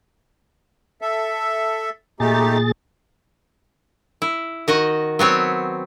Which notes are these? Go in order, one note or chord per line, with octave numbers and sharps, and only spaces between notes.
A4 E5
A#2 A3 D#4 G4 G#4 A6
E4
D#3 F#4 D#5
F#3 B3 C4 C#5